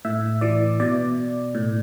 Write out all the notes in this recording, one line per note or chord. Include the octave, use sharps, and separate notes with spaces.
A2 E5
E3 D5
B2 D5
A2